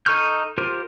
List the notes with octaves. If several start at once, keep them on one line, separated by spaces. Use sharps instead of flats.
D#4 A4 C#6 F6 G6
F4 G4 A#4 C5